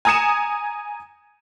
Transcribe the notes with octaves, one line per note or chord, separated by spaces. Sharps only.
G#5 A#5 D#6 G#6 C#7 E7